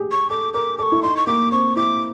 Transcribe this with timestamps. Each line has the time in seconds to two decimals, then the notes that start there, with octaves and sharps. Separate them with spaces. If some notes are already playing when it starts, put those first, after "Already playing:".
Already playing: G4 G#4
0.11 C#6
0.30 A4 D6
0.54 A#4 D6
0.78 A4 C#6 D6
0.92 E4
1.03 D#4 C6
1.17 C#6
1.27 A#3 D6
1.52 C4 C#6
1.76 E4 D6